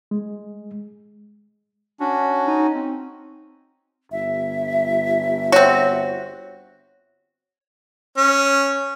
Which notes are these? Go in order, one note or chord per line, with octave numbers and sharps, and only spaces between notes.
G#3
C#4 D4 F#4
D#4
C4
G1 E5
C4 F#4 C#5
C#4